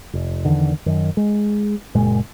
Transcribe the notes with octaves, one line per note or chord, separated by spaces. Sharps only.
F1
E2 D3 D#3
F#2 D#3
G#3
F#1 A#2 G#3